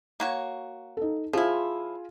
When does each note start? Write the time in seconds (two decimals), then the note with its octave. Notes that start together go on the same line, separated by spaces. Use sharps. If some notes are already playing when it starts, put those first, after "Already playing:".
0.20 A#3 F#4 C#5
0.97 D#4 A4
1.33 F3 E4 F4 G#4